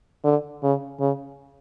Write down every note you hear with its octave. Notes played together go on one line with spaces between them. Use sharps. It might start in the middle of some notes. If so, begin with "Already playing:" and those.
D3
C#3
C#3